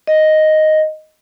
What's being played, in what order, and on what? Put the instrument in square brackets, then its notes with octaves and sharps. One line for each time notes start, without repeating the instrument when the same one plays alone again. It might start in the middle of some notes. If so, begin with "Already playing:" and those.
[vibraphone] D#5